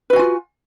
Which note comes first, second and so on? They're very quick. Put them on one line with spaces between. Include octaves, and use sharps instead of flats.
B4 F#4 G#5 F4